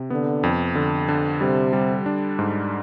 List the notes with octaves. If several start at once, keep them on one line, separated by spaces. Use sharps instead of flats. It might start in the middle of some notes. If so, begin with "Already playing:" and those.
Already playing: C3
D3 B3
F2
D3
D3
C3 G3
G3
D4
G#2